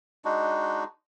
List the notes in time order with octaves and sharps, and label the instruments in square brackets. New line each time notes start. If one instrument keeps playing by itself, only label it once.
[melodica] G#3 D4 D#4 F#4